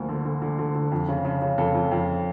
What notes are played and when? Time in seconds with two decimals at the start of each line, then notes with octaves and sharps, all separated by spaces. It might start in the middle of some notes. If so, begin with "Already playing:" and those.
Already playing: D2 F3 A#3
0.09 D3
0.25 D3
0.42 D3
0.59 D3
0.75 D3
0.92 F2
1.08 C#3
1.25 C#3
1.42 C#3
1.58 F2 A4
1.75 F2
1.91 F2